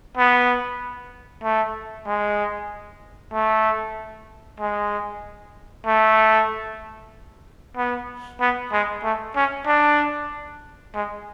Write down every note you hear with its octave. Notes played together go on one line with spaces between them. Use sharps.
B3
A3
G#3
A3
G#3
A3
B3
B3
G#3
A3
C#4
D4
G#3